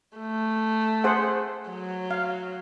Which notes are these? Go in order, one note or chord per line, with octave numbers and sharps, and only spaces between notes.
A3
G#4 C5 F#5
F#3
F5